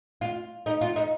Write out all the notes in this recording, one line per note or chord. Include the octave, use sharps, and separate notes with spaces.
F4
D#4
F4
D#4